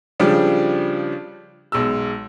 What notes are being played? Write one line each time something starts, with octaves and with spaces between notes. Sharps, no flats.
C#3 F3 G3 D4
B1 G#3 E6